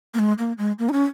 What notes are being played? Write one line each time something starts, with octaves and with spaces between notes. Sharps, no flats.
A#3
G#3
A#3
G#3
A#3
D#4
C#4